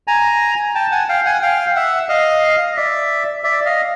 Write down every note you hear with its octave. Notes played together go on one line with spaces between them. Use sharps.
G#5 A#5
G5 A5
F#5 G#5
F5 G5
F#5 G#5
F5 G5
E5 F#5
D#5 F5
D#5
D5 E5
D5 E5
D#5 F5